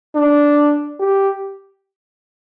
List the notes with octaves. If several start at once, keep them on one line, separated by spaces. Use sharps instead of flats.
D4
G4